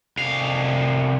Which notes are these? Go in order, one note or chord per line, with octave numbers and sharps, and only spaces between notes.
C2 F5